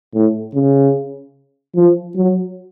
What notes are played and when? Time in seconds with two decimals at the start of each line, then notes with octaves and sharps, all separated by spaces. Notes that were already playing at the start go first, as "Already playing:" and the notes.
0.14 A2
0.54 C#3
1.76 F3
2.16 F#3